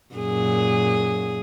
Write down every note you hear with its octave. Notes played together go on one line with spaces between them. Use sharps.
F#2 A#2 G#4